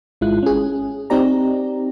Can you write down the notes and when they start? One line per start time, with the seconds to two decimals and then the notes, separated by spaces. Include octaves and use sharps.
0.21 G#1 G#3 E4 F4 F#6
0.43 C#4 G#4
1.10 C4 D#4 G4 D5 A#5